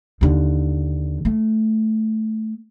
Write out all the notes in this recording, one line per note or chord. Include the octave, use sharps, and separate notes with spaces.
D#2 D3
A3